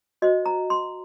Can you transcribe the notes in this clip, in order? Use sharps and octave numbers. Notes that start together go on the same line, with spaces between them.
F#4 C5 D#5
A#5
C6